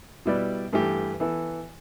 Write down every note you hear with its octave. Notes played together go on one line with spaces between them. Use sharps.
B2 G3 E4 B4 D5
G2 E3 A3 E4 G4
E3 B3 E4 A4